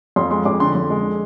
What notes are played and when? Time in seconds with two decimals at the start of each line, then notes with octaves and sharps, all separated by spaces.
0.16 F2 C6
0.31 G#3 C6
0.45 F2 D6
0.60 D3 C6
0.75 F2
0.90 G#3